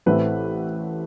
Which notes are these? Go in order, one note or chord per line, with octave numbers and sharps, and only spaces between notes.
A1 A2 E3 A3 C4 B4